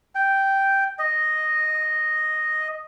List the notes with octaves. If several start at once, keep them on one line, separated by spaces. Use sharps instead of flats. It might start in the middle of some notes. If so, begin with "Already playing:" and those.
G5
D#5